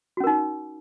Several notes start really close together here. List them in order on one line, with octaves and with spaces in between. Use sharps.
F#4 C#4 A#4 D#4